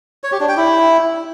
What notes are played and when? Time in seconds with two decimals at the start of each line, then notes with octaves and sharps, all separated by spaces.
0.24 C#5
0.32 G4
0.40 D4
0.49 G5
0.57 E4